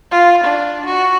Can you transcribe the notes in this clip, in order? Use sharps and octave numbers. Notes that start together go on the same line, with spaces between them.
F4
D4
F#4